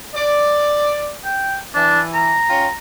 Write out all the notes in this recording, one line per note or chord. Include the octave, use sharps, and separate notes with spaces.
D5
G5
E3 D4
A#5
C#4 F4 G5